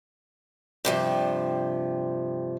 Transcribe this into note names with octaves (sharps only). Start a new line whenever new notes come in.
G2 C3 F3